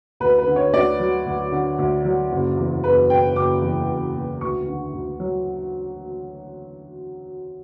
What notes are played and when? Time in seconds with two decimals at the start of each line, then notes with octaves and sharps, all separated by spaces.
0.20 D2 B4
0.38 B4
0.47 D3
0.56 C#5
0.73 D2 D5
0.99 F#3
1.26 D2
1.52 D3
1.78 D2
2.05 F#3
2.31 F#1
2.58 E2
2.84 F#1 B4
3.10 B2 G5
3.36 F#1 D6
3.62 E2
3.89 F#1
4.15 B2
4.41 D2 C#6
4.68 D3
4.94 D2
5.20 F#3